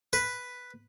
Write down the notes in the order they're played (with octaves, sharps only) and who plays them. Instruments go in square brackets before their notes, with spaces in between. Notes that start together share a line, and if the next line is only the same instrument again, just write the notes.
[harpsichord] B4